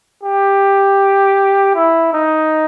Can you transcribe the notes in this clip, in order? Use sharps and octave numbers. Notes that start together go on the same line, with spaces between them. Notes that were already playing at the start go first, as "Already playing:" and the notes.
G4
E4
D#4